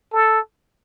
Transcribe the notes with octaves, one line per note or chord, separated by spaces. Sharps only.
A4